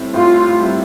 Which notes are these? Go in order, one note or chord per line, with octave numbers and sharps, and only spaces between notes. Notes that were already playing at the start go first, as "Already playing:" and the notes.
Already playing: A2 G3 C4 E4
A2 F4
G3 C4 E4